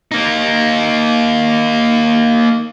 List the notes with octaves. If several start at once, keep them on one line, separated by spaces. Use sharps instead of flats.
A#3 D#4